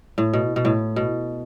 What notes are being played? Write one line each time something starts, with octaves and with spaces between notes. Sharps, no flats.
A2
B2
B2
A2
B2